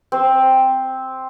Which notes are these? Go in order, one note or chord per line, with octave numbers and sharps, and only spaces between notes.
C4